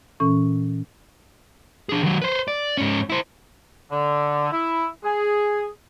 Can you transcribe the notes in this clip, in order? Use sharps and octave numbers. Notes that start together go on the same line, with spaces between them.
A#2 E3 C#4 A4 C#6
D4 G#4
D#3 F#3
B4 C5
D5
G#2 C#4
E4 C5
D3
E4
G#4